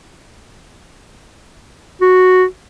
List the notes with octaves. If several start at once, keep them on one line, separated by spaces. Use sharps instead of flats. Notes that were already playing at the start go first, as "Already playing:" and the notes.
F#4